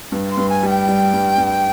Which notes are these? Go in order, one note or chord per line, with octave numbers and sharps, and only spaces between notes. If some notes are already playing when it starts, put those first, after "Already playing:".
G2
C6
G2
G#5
G3
G5
G3
G2
G2